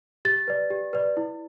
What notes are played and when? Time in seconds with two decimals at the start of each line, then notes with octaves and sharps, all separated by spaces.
0.25 G4 A6
0.48 B4 D5
0.70 G4
0.93 B4 D5
1.17 E4